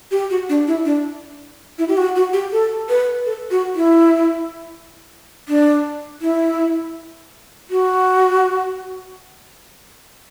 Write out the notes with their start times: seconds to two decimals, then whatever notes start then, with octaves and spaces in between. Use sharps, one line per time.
0.11 G4
0.30 F#4
0.49 D4
0.67 E4
0.85 D4
1.78 E4
1.88 G4
1.97 F#4
2.16 F#4
2.33 G4
2.52 A4
2.89 B4
3.26 A4
3.51 F#4
3.75 E4
5.48 D4
6.21 E4
7.70 F#4